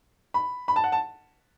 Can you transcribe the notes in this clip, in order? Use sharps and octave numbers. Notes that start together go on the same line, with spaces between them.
B5
B5
A5
F#5
A5